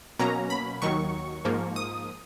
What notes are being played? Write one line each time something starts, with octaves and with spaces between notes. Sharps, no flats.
B2 F#3 A#3 C#4 A#5
B5
D#2 D#3 F#3 C#6
G#2 F3 A#3
D#6